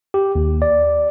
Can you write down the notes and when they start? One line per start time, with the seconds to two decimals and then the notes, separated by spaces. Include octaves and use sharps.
0.14 G4
0.35 D#2
0.62 D5